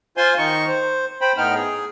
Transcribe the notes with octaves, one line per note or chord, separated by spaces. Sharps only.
F4 C5 G#5 C6
D#3 D#4 C#6
C5
C5 G5 B5
A2 B3 D#4 G5 F6
G#4